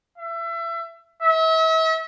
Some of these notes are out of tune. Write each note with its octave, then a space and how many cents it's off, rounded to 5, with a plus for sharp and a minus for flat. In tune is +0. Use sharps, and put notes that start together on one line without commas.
E5 +30
E5 -40